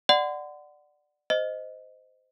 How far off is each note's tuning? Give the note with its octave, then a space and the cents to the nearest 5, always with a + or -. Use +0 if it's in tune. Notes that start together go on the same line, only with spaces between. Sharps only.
D5 +10 F#5 +0 C6 -40
C5 -20 D#5 +0